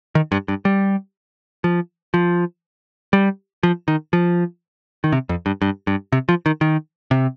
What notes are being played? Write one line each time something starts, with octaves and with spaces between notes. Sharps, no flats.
D#3
G2
G2
G3
F3
F3
G3
F3
D#3
F3
D#3
C3
F2
G2
G2
G2
C3
F3
D#3
D#3
C3